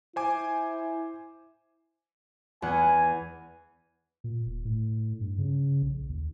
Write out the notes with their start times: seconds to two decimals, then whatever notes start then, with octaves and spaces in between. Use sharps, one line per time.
0.16 E4 C5 G#5 D6
2.62 E2 F#5 G#5
4.24 A#2
4.46 D#1
4.65 A2
5.20 G2
5.38 C#3
5.82 A#1
6.09 D#2